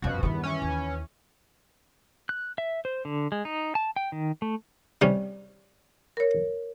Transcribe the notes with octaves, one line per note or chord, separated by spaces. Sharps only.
E1 F#2 B2 F3 F#4
E2 G2 D#3 B3
E3 C#4
D#2
F#6
E5
C5
D3
G#3
D#4
A5
G5
D#3
A3
C3 G3 C#4
A#4 C#5